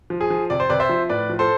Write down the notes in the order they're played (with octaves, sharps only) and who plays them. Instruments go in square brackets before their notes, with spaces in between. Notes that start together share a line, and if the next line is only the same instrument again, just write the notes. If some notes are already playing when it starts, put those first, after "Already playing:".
[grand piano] F3
G#4
F3
C3 D5
C5
C3 B4 D5
C5 E5
F3
A2 B4 D5
F3
A4 C5